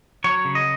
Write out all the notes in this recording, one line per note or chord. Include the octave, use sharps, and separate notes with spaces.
F#3 C#5
C#3
D#5